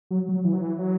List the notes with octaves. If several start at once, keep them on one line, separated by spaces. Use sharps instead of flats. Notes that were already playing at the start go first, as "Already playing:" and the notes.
F#3
F#3
E3
F#3
E3
F#3